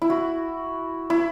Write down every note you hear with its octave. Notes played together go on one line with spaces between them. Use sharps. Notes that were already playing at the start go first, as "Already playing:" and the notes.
E4
F#4
E4